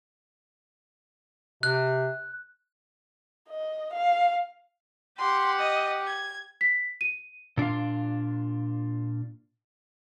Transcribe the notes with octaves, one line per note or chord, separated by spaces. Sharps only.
C3 F#6
D#5
F5
G4 F#5 C6
D#5
G#6
B6
D#7
A#2 D4 F4 F5